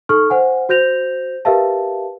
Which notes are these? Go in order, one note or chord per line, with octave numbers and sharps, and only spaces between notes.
D#4 A4 C#6 F6
C5 F#5 G#5
F#4 C5 G6 A#6 F7
G4 A#4 B4 E5 F5 A5